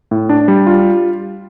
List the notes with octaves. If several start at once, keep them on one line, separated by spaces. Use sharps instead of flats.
A2
D4
G3
F4